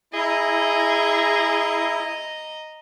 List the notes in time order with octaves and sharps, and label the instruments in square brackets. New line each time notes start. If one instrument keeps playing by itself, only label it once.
[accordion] E4 [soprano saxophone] G#4 [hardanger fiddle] D#5 A#5